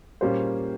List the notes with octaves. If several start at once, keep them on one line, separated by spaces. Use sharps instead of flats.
A#2 G3 A#3 C#4 C5